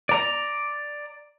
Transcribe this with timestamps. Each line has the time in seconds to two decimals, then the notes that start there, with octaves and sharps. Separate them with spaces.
0.09 D5 A#5